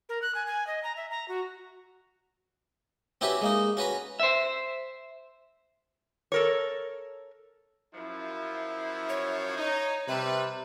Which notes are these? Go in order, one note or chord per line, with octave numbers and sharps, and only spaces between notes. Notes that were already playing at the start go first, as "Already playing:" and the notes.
A#4
F#6
G#5
G#5
D#5
A#5
E5
A#5
F#4
C4 C#4 E4 F#4 G4 B4
G#3 A#3 D#4
C#4 F#4 B4 A#5
C5 E5
A4 A#4 C#5
F#2 F3 E4
C#5
D#4
C3 G3 B4 C5 E5